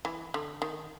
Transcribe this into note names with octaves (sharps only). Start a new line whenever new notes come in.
E3
D3
D#3